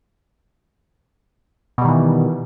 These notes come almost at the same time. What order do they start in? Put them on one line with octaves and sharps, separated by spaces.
B2 G3 D#3 E3